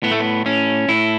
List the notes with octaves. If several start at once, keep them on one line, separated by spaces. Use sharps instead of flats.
A2 B3
A3
B3
A2 C#4
A2 E4